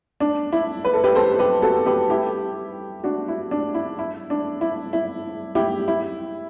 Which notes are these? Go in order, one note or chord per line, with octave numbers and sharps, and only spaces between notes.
D4
E4
B4
A4
G4 B4
A4 C5
G4 B4
F#4 A4
G4 B4
E4 G4
D4 F#4
E4
D4
E4
E4
D4
E4
E4
E4 G4
E4